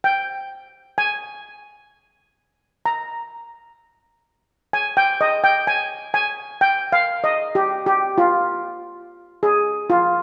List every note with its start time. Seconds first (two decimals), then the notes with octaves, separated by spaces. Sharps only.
0.04 G5
0.98 G#5
2.86 A#5
4.73 G#5
4.97 G5
5.21 D#5
5.44 G5
5.67 G#5
6.14 G#5
6.61 G5
6.92 F5
7.24 D#5
7.55 G4
7.86 G4
8.18 F4
9.43 G#4
9.90 F4